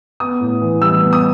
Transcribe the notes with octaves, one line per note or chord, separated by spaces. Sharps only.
B3 D#6
A2
E3
G3 E6
B3
D#6